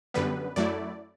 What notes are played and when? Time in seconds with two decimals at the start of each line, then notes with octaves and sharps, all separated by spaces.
0.14 F#2 D3 G3 B3 B4
0.56 F#2 F#3 A3 E4 D5